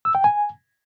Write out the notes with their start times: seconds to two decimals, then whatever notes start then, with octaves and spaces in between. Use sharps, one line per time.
0.05 E6
0.15 G5
0.24 G#5